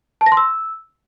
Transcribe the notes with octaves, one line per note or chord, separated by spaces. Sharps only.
A5
A#6
C6
E6